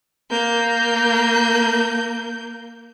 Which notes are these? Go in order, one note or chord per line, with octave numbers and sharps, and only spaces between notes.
A#3 G6